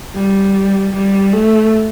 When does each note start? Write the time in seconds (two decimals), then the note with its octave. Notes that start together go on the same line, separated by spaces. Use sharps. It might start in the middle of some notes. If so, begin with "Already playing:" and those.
0.15 G3
0.93 G3
1.33 A3